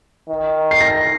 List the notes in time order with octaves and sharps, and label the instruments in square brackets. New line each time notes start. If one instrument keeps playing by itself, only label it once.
[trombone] D#3
[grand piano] C7
A#6